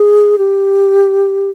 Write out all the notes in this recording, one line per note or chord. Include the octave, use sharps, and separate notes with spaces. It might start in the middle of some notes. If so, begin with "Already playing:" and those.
Already playing: G#4
G4